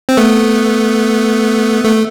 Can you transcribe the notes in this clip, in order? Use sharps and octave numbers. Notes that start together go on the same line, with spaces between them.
C4
A3 B3
A3